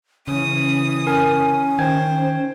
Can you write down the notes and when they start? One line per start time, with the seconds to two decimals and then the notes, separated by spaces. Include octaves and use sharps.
0.28 C#3 E3 C#4 D#6
1.07 C#4 A#4 G#5
1.79 D#3 C5 G5 G#6